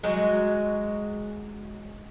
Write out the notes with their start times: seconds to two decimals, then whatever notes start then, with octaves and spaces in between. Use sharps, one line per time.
0.03 F#3 G#3